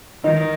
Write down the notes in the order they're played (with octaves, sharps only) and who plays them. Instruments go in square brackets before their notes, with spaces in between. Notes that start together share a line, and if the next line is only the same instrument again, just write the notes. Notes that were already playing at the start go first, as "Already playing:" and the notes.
[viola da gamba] D#3 [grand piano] D#4